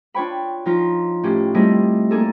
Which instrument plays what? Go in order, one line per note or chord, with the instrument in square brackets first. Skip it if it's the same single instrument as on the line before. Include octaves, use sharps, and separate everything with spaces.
[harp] D4 F4 C#5 G5 B5
F3 D#4 F4
A2 C#4 G4
G3 A3 C4 E4 G#4 D#5
A#3 D4 G#4 A4